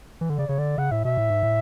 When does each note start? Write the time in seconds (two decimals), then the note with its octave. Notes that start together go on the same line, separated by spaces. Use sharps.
0.21 E3
0.29 D3
0.38 C#3 D5
0.48 C#3 C#5
0.58 D3 D5
0.78 C#3 F#5
0.91 A2 E5
1.05 B2 E5
1.17 A2
1.30 G#2
1.43 A2